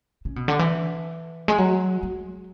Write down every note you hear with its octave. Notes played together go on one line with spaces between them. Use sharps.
C#3
B2
D3
E3
G#3
F#3
G#3